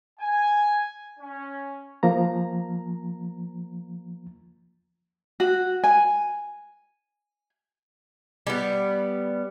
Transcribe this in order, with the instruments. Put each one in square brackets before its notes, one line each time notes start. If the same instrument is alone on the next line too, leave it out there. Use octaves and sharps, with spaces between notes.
[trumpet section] G#5
C#4
[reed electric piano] F3 A#3 A#5
[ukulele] F#4
G#5
[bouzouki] G3 B3